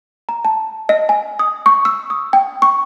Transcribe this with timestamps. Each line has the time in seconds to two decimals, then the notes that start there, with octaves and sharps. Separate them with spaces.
0.29 A#5
0.45 A5
0.89 D#5
1.09 G#5
1.39 D#6
1.66 C#6
1.85 E6
2.10 D#6
2.33 G5
2.62 C#6